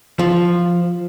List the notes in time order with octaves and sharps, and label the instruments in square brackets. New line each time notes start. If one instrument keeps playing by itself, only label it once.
[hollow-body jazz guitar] F3